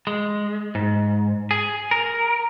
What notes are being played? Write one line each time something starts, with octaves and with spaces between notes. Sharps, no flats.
G#3
G#2
G#4
A#4